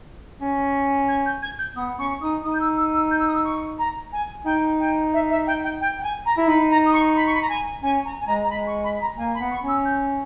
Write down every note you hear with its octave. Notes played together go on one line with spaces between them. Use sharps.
C#4
G#6
G6
G#6
G6
B3 D#6
C#4 C#6
D#4 D#6
D#4 D#6
G6
E6
E6
E6
G6
E6
D#6
E6
C#6
A#5
G#5
D#4 G5
G5
E5
E5
G5
G5
G5
G5
G#5
A#5
E4
D#4 B5
A#5
D#6
C#6
B5
C#6
B5
A#5
G#5
C#4 G#5
A#5
G#5
G#3 A#5
A#5
G#3 B5
C#6
B5
A#5
A#3 G#5
B5
B3
C#6
C#4
E6
G6